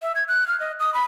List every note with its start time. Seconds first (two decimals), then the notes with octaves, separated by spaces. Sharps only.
0.02 E5
0.16 G#6
0.28 F#6
0.48 F6
0.60 D#5
0.80 D#6
0.94 B5